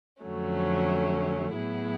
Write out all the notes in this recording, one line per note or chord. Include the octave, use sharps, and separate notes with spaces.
F2 D3 F#3 A3 C#4
A2 F#3 B3 E4 G#4